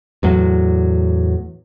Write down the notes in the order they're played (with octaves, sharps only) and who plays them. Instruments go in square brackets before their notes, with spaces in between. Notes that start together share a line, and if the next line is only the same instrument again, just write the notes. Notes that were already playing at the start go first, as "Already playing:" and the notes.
[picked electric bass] E2 A2 F#3